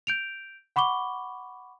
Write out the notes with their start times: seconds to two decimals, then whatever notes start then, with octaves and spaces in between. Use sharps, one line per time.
0.07 G6 D7 F7
0.76 F#5 B5 C#6 D6 G7